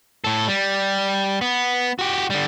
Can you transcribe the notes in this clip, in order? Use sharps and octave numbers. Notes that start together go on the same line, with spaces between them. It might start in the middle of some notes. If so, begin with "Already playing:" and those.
A2 A4
G3
B3
F#4 G4
D3 G3